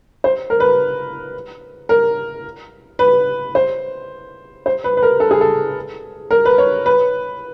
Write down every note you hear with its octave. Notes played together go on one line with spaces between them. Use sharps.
C5
A#4
B4
A#4
B4
C5
C5
B4
B4
A#4
A4
G#4
A4
A#4
B4
C#5
B4